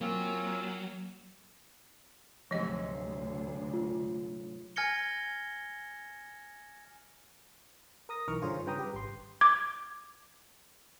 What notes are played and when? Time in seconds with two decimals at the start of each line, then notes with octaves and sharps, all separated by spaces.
0.01 F#3 A#3 C4 C#4 F4
2.51 D2 G#2 C3 F3 F#3 D#5
3.74 F4
4.76 G#5 F6 G#6 A#6 C#7 G7
8.09 A#4 D#6 A#6
8.28 B1 D#3 E3 A#4 C#6 F6
8.42 G2 D3 F4 G#4 C5 C#5
8.66 G2 C#3 B4 G5 A#5 D#6
8.79 G4 B4
8.94 G#1 C6
9.41 D6 G#6